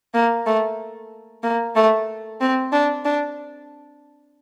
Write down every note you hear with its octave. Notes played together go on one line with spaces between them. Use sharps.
A#3
A3
A#3
A3
C4
D4
D4